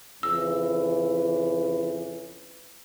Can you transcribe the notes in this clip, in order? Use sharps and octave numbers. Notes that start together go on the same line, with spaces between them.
F2 C#3 E3 E6